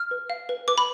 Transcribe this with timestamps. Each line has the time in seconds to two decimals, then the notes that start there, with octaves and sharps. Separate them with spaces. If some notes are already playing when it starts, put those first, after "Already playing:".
Already playing: F6
0.11 B4
0.30 F5
0.49 B4
0.68 B4 D6
0.78 B5